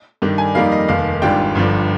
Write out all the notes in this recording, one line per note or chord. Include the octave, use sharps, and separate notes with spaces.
G2 D#3 G3 D4
G#5
F2 D#3 G3 A#3 D#4 F5
D#5
F1 D#2 D#3 F5
G#1 G#2 G3 D4 F4 G5
G1 G2 F3